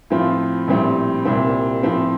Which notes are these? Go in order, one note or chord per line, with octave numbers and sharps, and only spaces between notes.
A2 F3 C4 F4
A#1 A2 G3 C4
C2 A#2 G3 C4
A2 F3 C4